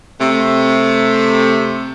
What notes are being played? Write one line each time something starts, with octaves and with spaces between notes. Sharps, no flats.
C3 A3